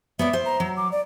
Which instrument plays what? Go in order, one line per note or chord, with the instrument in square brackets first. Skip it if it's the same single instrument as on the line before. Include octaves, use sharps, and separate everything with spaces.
[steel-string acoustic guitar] B3 C#5 D5 [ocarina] E5
[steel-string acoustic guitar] C5
[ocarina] A#5
[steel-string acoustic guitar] F#3
[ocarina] D6
D5